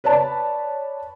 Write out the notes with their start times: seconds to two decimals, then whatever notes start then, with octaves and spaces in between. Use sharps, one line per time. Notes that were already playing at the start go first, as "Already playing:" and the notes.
0.04 B4 C#5 D5 A5 B5